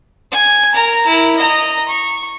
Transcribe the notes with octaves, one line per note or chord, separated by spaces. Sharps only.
G#5
A#4 A#5
E4 A#4
D#5 A#5
C#6